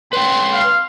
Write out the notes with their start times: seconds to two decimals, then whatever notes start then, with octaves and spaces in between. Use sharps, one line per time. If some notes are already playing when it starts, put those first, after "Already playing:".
0.13 B4 C#5 G5 C6
0.53 F5